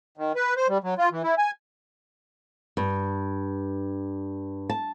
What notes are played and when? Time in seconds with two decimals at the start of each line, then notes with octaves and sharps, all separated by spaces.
0.17 D#3
0.36 B4
0.57 C5
0.69 G3
0.84 F#3
0.98 F4
1.12 E3
1.23 E4
1.38 G#5
2.77 G2
4.69 A5